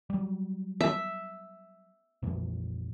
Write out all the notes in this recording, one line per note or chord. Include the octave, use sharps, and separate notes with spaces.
F#3 G3
E5
F2 A#2 E3